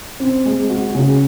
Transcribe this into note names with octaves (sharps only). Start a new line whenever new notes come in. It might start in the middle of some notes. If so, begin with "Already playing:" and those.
C4
G#3
F#4
C#3